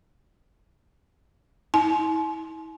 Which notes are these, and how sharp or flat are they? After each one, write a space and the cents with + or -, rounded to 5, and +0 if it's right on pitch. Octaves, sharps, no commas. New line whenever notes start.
E4 -40 G#5 +45